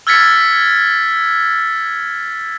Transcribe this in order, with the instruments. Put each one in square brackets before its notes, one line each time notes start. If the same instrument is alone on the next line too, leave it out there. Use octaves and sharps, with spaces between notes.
[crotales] E6 F6 G#6 A6 B6 C#7